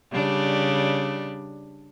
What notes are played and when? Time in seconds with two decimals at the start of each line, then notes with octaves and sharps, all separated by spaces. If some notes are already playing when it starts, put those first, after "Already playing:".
0.12 C#3 G3 D4